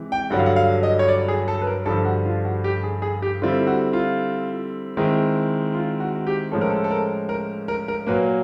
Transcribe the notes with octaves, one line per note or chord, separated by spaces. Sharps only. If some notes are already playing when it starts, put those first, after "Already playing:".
Already playing: C3 E3 G#3
G5
G2 D3 F#3 F#5
F5
F#5
F5
D#5
C#5
D5
G#4
A4
B4
A#4
G2 D3 F3 A4
F#4
F4
F#4
G4
G#4
G#4
G4
D3 G3 C4 E4 F4
F#4
F4
D#3 G#3 C4 E4
F4
F#4
F#4
G4
A2 F3 G#3 C#4 A4
A#4
A4
A4
A#4
A#4
A#4
A#4
A#2 F#3 A#3 B4